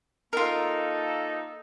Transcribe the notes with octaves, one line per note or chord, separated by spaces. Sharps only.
A#3 D#4 F4 A4 A#4